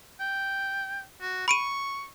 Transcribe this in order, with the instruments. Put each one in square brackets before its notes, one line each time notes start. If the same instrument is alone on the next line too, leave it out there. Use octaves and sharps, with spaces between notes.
[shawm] G5
F#4
[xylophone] B5 D7 D#7 [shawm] C#6